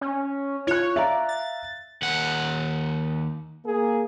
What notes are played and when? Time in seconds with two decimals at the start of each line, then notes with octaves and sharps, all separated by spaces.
0.01 C#4
0.67 F4 C#5 F#6
0.96 D5 E5 F5 A#5
1.29 A6
2.02 D#2 F#5
3.66 A#3 G#4